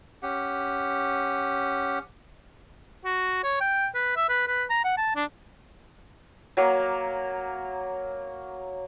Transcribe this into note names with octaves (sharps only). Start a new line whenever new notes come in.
C#4 G4 F#5
F#4
C#5
G5
B4
E5
B4
B4
A#5
F#5
A5
D4
F#3 A#3